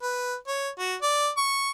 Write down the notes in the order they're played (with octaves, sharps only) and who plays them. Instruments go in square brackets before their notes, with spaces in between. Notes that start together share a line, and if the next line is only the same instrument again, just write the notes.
[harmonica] B4
C#5
F#4
D5
C#6